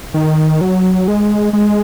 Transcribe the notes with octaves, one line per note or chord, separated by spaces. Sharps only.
D#3
F#3
G#3
G#3